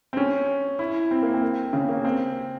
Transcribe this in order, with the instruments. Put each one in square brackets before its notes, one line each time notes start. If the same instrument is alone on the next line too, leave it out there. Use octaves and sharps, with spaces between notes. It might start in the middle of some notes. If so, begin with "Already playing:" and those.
[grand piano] C4
C#4
E4
C4
A#3
C4
C#3
A#3
C4